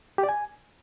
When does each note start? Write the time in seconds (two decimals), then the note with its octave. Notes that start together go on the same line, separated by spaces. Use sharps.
0.18 G4
0.23 D5
0.29 G#5